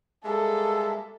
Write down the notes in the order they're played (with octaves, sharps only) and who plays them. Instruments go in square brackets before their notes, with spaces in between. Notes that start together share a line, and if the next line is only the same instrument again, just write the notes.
[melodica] G3 A#3 E5 [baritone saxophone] G#3 [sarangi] A4